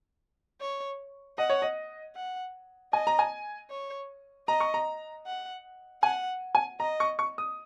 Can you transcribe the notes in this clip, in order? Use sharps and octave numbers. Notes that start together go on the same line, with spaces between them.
C#5
D#5 F#5
C#5
D#5
F#5
D#5 G#5
A#5
G#5
C#5
D#5 A#5
C#6
A#5
F#5
F#5 G#5
G#5
D#5 A#5
C#6
C#6
D#6